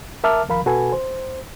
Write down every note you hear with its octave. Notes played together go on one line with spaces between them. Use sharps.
A#4 E5 A5 D6 F6
D#2 F3 A#4 F5 B5
B2 F#4 A4 B4 G#5
C5